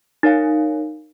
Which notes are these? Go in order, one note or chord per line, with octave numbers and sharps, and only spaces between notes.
D#4 A#4 C#5 F5 G#5